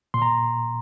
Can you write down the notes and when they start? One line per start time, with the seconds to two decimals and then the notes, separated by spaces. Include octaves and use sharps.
0.14 A#2 C6
0.22 A#5